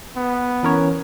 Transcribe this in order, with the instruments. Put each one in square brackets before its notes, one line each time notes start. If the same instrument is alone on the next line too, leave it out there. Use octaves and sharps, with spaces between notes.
[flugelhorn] B3
[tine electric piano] E3 A#4 C#5 [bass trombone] C#4